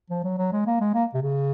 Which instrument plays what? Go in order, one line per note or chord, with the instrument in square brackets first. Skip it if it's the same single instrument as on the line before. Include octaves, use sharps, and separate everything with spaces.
[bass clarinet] F3
F#3
F#3
G#3
A#3
G#3
A#3
C3
C#3